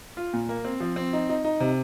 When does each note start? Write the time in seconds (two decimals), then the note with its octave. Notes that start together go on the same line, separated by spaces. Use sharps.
0.17 F4
0.34 A#2
0.49 A#3
0.65 C4
0.80 F3
0.96 C4
1.13 D#4
1.29 D#4
1.44 D#4
1.60 C3